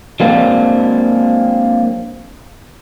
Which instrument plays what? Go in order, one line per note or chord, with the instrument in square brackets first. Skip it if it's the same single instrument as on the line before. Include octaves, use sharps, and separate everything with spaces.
[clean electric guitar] F#3 G#3 A#3 C4 D4